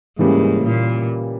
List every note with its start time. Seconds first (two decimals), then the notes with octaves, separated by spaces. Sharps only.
0.18 G#2 C#3 E3 G3 A#3 C#4
0.64 A#2